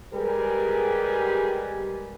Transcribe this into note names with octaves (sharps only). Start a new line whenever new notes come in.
G3 G#3 G4 G#4 A#4 B4